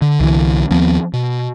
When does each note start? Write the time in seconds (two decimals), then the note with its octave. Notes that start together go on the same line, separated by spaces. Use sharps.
0.02 D3
0.20 C2 D3 E3
0.71 D#2 F3 B3 C4
1.13 B2